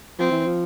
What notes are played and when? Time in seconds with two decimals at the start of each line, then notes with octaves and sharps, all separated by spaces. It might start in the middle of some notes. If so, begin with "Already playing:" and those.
0.19 F3 C4
0.32 E3
0.45 F3